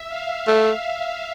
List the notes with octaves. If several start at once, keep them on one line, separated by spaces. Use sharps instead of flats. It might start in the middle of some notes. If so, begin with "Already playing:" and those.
Already playing: E5
F5
A3